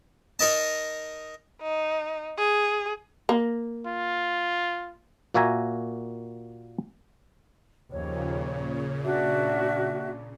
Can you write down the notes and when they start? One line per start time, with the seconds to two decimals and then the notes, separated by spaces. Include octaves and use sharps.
0.39 D#4 A#4 D#5 A5
1.62 D#4
2.38 G#4
3.29 A#3
3.86 F4
5.34 A#2 A#3 F#4 E5 G#5 A#5
7.92 D#2 A#2 C#3 F3 C#5
9.03 D4 F#4 E5